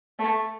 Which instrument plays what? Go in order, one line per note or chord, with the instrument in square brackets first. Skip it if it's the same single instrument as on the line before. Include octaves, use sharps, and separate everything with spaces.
[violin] A3